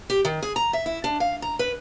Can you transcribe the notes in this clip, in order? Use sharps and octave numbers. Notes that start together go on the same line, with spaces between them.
G4
D#3
G#4
A#5
E5
E4
D4
F5
A#5
B4